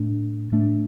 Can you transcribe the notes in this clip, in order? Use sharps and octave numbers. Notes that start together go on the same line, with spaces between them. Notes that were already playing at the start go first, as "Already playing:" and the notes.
Already playing: A2 A3 D4
A2 A3 D4